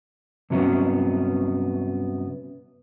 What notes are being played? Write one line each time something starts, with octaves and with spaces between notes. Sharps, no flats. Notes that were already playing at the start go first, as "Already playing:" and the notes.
G2 C3 F#3 G3 B3 C#4